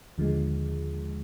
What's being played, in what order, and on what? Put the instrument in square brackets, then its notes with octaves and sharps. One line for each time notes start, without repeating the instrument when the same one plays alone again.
[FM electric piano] D#2 D3 F3 G#3